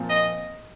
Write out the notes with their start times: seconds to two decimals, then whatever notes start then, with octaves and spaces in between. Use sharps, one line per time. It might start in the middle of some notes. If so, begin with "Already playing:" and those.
Already playing: A#2 F3 C4
0.10 D#5